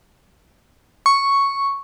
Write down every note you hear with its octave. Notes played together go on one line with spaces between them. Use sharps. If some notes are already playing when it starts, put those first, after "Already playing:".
C#6